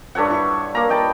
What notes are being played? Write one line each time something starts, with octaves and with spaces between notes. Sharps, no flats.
G2 A4 C#5 F#5
E4 C#6
A#3 F5 A#5
D#5 G5 A5 B5